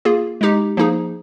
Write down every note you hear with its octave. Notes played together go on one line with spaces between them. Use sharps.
A#3 F4 G#4
G#3 D#4 G4
F3 A#3 D#4 G#4